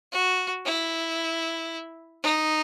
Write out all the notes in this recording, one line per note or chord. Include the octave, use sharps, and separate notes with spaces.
F#4
E4
D#4